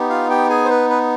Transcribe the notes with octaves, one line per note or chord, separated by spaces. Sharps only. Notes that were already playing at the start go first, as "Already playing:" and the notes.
Already playing: B3 D#4 G4
F4 F5
G4 G5
G#4 G#5
C5
B4
B4